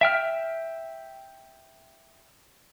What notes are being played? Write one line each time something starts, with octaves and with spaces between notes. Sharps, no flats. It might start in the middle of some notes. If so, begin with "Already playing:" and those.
E5 G5 F6